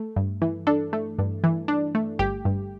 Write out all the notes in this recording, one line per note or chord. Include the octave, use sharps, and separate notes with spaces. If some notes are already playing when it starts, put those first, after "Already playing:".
Already playing: A3
G2
E3
D4 A4
A3
G2
E3
D4
A3
G1 G4
G2